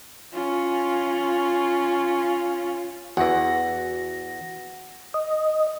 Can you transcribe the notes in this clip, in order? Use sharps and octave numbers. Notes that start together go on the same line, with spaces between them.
C#4 F4
E2 E3 F#4 F#5 A#6
D#5